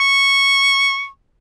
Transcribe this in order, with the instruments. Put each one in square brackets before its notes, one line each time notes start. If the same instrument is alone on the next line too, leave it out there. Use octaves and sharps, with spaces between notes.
[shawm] C#6